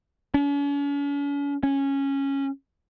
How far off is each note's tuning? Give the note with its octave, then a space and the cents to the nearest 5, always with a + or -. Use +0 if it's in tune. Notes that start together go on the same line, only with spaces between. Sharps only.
C#4 +45
C#4 -10